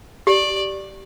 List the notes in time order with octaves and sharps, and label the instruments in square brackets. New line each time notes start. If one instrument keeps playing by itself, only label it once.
[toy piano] G4 [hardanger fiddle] D5